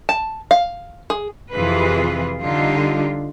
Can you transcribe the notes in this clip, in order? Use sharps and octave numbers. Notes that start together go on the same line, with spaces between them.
A5
F5
G#4
F2 C3 E3 F4 G#4 B4
D3 G3 D#4 F4 G4